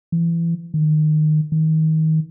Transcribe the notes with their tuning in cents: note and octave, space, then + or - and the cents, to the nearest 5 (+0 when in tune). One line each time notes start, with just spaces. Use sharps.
E3 +25
D#3 -20
D#3 +25